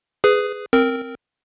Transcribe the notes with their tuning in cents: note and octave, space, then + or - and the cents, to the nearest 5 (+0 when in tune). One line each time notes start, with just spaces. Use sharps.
G#4 +0 B4 +20
C4 +0 A#4 -5